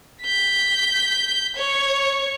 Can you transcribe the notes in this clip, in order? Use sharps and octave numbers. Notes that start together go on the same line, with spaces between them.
G6 B6
C#5 C#6